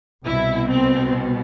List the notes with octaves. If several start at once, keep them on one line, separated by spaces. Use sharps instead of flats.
C2 B2 E4
C4